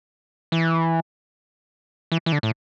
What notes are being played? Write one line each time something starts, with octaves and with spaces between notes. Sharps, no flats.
E3
E3
E3
D3
A2